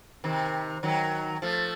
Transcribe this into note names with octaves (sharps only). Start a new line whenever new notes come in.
C3 D#3
D#3 F#3
F3 A3